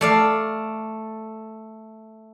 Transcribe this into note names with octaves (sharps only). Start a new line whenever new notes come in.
A3 D5 F5